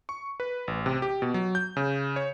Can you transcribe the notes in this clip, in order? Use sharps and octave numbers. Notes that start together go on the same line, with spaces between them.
C#6
B4
A1
C3
G4
B2
F#3
G6
C#3
C#5